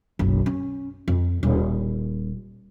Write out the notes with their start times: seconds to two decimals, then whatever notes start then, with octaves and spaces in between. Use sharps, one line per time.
0.19 F#1 B1
0.46 C#4
1.08 F2
1.43 D#1